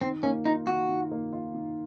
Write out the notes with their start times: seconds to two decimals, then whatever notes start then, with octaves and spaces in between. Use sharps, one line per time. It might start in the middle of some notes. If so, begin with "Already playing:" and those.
0.01 D#3 C4
0.23 A#3 C#4
0.45 D#4 F4
0.67 D#3 F#4
0.89 D#3
1.11 A#3
1.33 F4
1.54 D#3